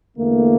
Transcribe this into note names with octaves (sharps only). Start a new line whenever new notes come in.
E2 D3 A3 A#3